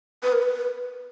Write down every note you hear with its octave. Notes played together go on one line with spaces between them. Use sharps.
B4
A#4
B4